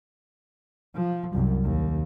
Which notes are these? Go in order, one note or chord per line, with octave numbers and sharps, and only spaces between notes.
F3
C2 F#2
D#2